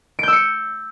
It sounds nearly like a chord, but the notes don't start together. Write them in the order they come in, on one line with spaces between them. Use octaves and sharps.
D7 G6 E6 C#7